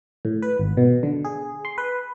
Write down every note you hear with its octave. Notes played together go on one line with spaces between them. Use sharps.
A2
B4
G#1
B2
D3
G#4
C6
B4